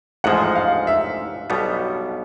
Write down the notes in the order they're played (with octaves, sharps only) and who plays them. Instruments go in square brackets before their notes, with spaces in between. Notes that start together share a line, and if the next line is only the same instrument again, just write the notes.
[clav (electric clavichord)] A1 G#2 F3 G#3 [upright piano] F#5
[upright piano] F5
E5
[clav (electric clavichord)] B1 B2 G3 B3